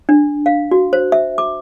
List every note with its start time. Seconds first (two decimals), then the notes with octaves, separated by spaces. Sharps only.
0.09 D4
0.46 F5
0.71 F#4
0.93 C5
1.12 E5
1.38 D6